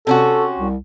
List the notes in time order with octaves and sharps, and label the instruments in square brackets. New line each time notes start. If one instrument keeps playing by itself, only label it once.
[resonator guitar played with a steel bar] C3 C#4 F#4 [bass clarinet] A4
[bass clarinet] C2